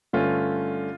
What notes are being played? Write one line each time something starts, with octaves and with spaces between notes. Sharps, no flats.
G2 D3 A3 C#4 F4